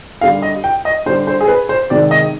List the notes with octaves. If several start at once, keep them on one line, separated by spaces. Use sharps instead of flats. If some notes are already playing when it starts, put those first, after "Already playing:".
D3 G3 F5
D#5
G5
D#5
D3 G3 C5
C5
G#4
B4
C5
C3 D#3 G#3 D5
D#5